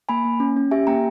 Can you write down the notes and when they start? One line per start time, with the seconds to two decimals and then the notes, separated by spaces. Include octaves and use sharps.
0.09 A#3 G#5 B5
0.25 A#3
0.40 C#4
0.57 C#4
0.71 G4 E5 G#5
0.87 A#3 G5 A#5